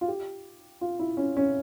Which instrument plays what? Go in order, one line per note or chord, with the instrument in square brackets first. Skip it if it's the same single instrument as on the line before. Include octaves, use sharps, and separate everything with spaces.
[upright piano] F4
G4
F4
E4
C#4
C#4